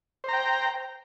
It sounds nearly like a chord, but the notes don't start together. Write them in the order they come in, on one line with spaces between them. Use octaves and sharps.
C5 A#5 G5